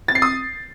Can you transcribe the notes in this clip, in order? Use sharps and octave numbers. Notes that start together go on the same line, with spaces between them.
A6
C7
D#6